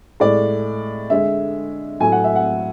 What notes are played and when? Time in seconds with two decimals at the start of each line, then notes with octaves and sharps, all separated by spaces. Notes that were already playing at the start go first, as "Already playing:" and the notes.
0.20 A2 G#3 D5
1.10 D3 G#3 E5
2.00 A2 F#3 A3 G#5
2.12 F#5
2.24 E5
2.36 F#5